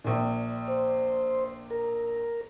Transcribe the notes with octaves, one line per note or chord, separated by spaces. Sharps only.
A#1 A#2
C5
A#4